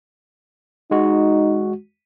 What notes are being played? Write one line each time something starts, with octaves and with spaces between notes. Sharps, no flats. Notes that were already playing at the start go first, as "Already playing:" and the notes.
G#3 D#4 F#4